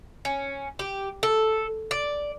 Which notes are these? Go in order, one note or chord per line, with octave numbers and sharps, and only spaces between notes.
C#4
G4
A4
D5